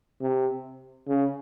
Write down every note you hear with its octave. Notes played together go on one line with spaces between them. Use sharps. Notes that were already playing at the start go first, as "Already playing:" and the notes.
C3
C#3